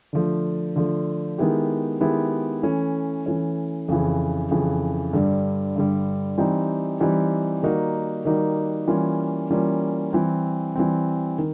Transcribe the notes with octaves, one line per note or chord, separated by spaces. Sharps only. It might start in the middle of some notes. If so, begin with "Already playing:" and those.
D3 F3 A3
D3 F3 A3
D#3 G#3 B3 E4 G4
D#3 G#3 B3 E4 G4
E3 A3 C#4
E3 A3 C#4
F2 C#3 E3
F2 C#3 E3
G2 D3 G3
G2 D3 G3
E3 G3 C4 D#4 G4
E3 G3 C4 D#4 G4
D#3 G3 A#3 D#4 F#4
D#3 G3 A#3 D#4 F#4
E3 G3 A#3 C#4 F4
E3 G3 A#3 C#4 F4
E3 G3 C4
E3 G3 C4
D#3